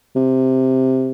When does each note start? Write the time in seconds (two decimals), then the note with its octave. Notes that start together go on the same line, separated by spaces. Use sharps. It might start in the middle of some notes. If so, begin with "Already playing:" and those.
0.16 C3